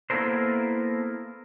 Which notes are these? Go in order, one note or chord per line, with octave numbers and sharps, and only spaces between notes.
A#3 B3 E4 A4 A#4 C5